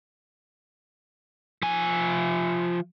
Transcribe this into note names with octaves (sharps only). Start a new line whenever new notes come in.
F3 G#5